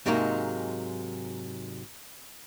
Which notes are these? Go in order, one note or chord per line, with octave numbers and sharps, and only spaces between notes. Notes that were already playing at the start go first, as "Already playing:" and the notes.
G#2 C3 F#3 G#3 A#3 D#4